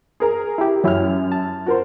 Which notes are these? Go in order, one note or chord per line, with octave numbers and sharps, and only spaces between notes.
G#4 A#4 A#5
E4 G4
F#2 F#3 C#4 E4 F6
A5
F#4 A#4 C5